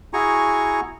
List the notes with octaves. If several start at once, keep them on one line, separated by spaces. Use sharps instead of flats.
E4 F#4 G#4 G#5 A#5 C#6